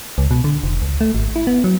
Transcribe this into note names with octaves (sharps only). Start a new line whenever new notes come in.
C#2
B2
D3
F1
C#2
A3
G#1
E4
B3
F#3